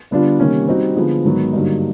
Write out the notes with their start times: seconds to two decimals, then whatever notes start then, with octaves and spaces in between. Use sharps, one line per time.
0.11 D3 G3 B3 D4 F4
0.40 C3 D#3 G3 A#3 C#4
0.67 G3 C4 D#4 F#4
0.96 D3 F3 G#3 B3
1.25 G#2 D#3 F#3 B3
1.53 G2 D3 F#3 A#3 D#4